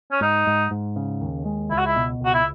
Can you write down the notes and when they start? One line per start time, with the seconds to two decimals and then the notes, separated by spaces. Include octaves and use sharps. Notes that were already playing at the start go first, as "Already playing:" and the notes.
0.12 C#4
0.21 G#2 D#4
0.47 G#2
0.71 G#2
0.96 C#3
1.21 D#2
1.46 G#3
1.71 C#2 E4
1.78 F#4
1.86 E4
1.96 B2
2.21 C#2 F#4
2.34 E4